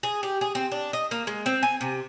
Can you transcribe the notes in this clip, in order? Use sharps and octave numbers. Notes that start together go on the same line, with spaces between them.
G#4
G4
G#4
C4
D4
D#5
A#3
G#3
C4
G#5
C3